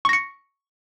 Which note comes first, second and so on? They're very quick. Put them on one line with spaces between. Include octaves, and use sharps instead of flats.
C#6 A#6 C#7